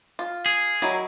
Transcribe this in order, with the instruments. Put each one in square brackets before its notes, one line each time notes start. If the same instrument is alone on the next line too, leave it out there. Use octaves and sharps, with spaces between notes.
[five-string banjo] F4
[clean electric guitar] G#4
[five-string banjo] D#3 F#3 E4